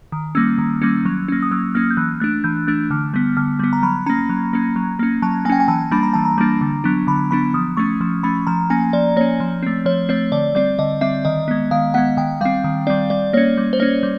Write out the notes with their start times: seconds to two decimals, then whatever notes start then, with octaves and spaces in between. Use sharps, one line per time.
0.12 D#3
0.35 G3 A#3 C#4 E6
0.58 D#3
0.82 G3 A#3 C#4
1.05 F#3
1.28 A#3 C#4
1.42 D#6
1.51 F#3 E6
1.75 A#3 C#4 F6
1.90 G6
1.97 E3 F#6
2.20 A3 D4 F#6
2.44 E3 G6
2.67 A3 D4 F#6
2.91 D3 F6
3.14 G3 B3
3.37 D3 F6
3.59 G3 B3
3.73 A#5
3.83 F#3 B5
4.06 A#3 C#4 A#5
4.29 F#3
4.53 A#3 C#4
4.76 F#3
4.99 A#3 C#4
5.22 F#3 A5
5.45 A#3 G#5
5.49 C#4 G5
5.60 G#5
5.68 E3 A5
5.91 G3 A#3 D4 B5
6.03 A#5
6.13 E3 A5
6.25 A#5
6.38 G3 A#3 D4
6.61 D3
6.84 F#3 B3 D4
7.07 D3 B5
7.31 F#3 B3 D4 B5
7.54 F3 D#6
7.77 A3 C#4 C#6
8.01 F3
8.23 A3 C#4 B5
8.47 F3 A#5
8.70 A#3 C#4 G#5
8.93 F3 D5
9.16 A#3 C#4 C#5
9.40 F3
9.63 A3 C4
9.85 F3 C#5
10.09 A3 C4 C#5
10.32 D3 D5
10.55 G3 C4 D5
10.79 D3 D#5
11.01 G3 C4 E5
11.25 D#3 D#5
11.48 G#3 B3
11.71 D#3 F5
11.94 G#3 B3 F#5
12.17 D#3 G5
12.41 G3 C4 F5
12.64 D#3
12.87 G3 C4 D5
13.10 G3 D5
13.33 A#3 C#4 C#5
13.57 G3
13.73 C5
13.79 A#3 C#4 C#5
14.03 G3